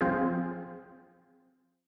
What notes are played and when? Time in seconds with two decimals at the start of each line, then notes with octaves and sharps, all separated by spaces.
0.01 F3 C4 F4 G#4